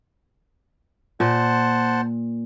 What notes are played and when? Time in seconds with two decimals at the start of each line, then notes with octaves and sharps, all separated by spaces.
1.20 A#2 C5 F#5 A5